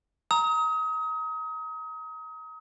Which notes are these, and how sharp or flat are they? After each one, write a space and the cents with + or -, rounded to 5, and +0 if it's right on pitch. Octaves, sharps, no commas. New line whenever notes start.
A#5 +0 D#6 +35